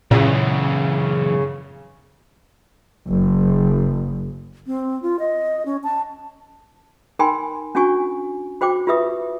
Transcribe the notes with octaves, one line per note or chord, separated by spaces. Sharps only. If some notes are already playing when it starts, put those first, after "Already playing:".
F#2 A#2 C#3 E3
F#1
C4
F4
D#5
C#4
A5
D#4 A#4 G5 G#5 B5 C6
C#4 D4 F#4 G#5 C#6
F#4 C5 G5 D6
F4 G4 B4 E5 D#6